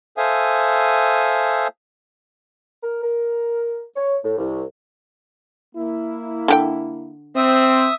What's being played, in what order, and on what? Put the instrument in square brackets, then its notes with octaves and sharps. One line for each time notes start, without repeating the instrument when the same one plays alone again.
[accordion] A4 C5 E5 F5 G#5 D#6
[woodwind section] A#4
A#4
C#5
A2
C2
[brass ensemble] A#3 E4
[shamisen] D3 G4 G5
[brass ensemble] C4 [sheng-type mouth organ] E5 D#6